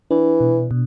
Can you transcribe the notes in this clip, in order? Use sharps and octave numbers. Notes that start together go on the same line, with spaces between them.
E3 D4
B2
B2